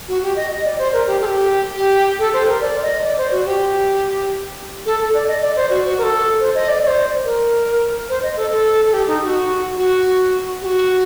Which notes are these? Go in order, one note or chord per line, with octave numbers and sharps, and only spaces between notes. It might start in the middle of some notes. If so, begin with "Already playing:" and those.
F#4
G4
D#5
D#5
D5
C5
A#4
G4
A4
G4
G4
A4
C5
A#4
D5
D#5
D5
C5
F#4
G4
A4
A4
D5
D#5
D5
C5
F#4
F#4
A#4
A4
C5
D#5
D5
D5
C5
A#4
C5
D#5
A4
A4
A4
G4
D#4
G4
F#4
F#4
G4
F#4